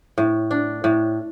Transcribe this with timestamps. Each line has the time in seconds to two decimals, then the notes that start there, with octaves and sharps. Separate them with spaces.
0.18 A2
0.51 D4
0.84 A2